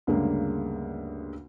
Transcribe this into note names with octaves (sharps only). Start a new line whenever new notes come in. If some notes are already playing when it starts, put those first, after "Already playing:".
D2 G2 C#3 G3 G#3 A#3